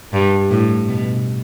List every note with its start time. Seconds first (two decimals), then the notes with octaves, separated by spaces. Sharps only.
0.13 G2
0.51 A2
0.88 B2